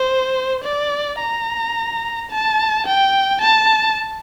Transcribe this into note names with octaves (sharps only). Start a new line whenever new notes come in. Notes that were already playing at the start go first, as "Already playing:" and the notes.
Already playing: C5
D5
A#5
A5
G5
A5